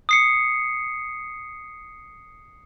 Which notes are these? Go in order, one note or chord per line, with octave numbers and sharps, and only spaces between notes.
D#6 C7 C#7